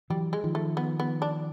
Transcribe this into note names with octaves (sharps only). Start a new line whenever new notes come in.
E3 F#3 G3
G#3
D#3 F3
A3
B3
B3
D4